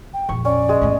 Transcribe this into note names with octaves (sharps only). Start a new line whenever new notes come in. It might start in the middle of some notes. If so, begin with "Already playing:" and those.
G5
A#1 F2 C#6
C#4 D5
G#3 G#4
E2 A2